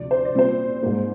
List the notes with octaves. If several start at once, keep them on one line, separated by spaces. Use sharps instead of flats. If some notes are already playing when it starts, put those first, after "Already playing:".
Already playing: D2 C3 F3 D5
C5
D5
A#2 G3 C4 C5
G#2 G3 A#3